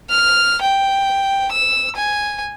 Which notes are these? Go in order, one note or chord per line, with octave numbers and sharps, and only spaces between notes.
F6
G5
E6
G#5